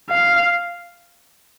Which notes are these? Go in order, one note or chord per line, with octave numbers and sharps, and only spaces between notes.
F5